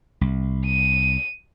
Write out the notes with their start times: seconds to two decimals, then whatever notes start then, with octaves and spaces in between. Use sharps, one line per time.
0.21 C2
0.65 D#7